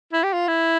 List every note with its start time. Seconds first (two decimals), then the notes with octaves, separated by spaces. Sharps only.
0.13 E4
0.24 G4
0.33 F4
0.48 E4